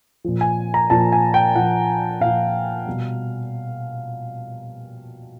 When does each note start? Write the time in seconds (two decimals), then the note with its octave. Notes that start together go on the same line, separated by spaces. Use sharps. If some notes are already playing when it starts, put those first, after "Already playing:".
0.24 A#2 F3
0.41 G#5
0.74 A#5
0.90 A#2 F3 A5
1.12 G#5
1.34 G5
1.55 A#2 F3 F#5
2.21 A#2 F3 F5
2.87 B2 G3